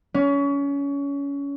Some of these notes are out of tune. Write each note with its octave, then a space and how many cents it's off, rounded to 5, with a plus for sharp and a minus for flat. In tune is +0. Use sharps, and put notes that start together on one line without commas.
C#4 +25